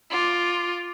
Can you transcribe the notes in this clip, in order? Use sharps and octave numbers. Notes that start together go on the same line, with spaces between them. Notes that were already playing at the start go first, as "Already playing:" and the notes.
F4 D6